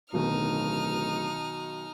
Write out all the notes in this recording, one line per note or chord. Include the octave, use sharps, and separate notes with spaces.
D1 B1 B2 D#3 D#4 F6